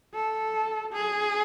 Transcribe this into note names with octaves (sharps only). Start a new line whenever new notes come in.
A4
G#4